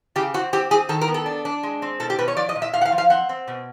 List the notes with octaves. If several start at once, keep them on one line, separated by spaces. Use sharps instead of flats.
C#3 G4
C4 F#4
C4 G4
C4 G#4
D#3 A4
A#4
B3
A4
D4
D4
G#3
C4
B2 A4
G4
B2 B4
C#5
F3 D5
D#5
A#2
E5
A#2 F5
F#5
F5
F3
F5
C4 F#5
C4
B2